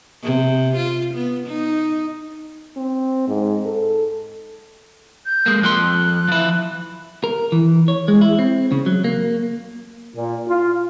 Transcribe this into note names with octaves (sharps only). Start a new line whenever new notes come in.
C3
F4
B3
D#4
C4
G#2
A4
G6
G#3 A#3
F2 F3 C6 F#6
F3 E4
A#4
E3
C#5
G#3
E4
C4
C#3
F#3
A#3
A#2
F4